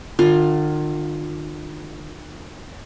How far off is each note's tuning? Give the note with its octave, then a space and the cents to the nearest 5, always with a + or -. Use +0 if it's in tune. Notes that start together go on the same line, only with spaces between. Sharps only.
D#3 -45 F4 +20